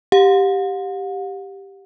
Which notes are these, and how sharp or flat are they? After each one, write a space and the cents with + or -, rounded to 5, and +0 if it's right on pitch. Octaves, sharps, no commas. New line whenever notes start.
G4 +0 F#5 -45